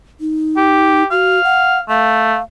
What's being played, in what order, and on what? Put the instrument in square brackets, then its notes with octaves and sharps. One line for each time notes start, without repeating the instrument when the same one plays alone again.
[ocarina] D#4
[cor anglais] G4
[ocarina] F#4 [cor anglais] F5
[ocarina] F#5
[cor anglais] A3 [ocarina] F5